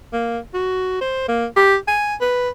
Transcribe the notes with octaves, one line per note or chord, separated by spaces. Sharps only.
A#3
F#4
C5
A#3
G4
G#5
B4